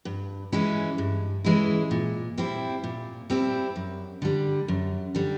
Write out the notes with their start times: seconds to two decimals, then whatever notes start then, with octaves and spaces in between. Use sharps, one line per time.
0.05 G2
0.52 E3 G#3 C#4 E4
0.98 G2
1.44 E3 G#3 C#4 E4
1.91 A#2
2.38 G3 C4 E4
2.84 A#2
3.30 G3 C4 E4
3.76 F#2
4.22 D3 G3
4.68 F#2
5.15 D3 G3